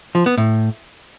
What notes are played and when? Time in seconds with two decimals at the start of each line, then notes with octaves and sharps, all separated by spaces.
0.15 F3
0.26 B3
0.37 A2